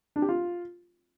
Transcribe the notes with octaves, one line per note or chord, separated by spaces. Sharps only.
D4
G4
F4